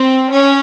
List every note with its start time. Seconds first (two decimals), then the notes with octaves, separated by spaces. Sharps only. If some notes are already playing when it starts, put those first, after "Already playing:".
Already playing: C4
0.30 C#4